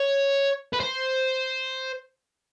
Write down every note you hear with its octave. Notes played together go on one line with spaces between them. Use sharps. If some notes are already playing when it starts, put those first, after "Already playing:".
Already playing: C#5
B4
C5